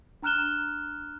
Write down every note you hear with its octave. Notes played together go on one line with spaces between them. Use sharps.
D4 A#5 F6 F#6 E7 G7